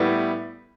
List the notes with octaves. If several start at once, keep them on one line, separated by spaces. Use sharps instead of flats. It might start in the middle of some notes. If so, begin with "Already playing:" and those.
Already playing: A2 G3 B3 E4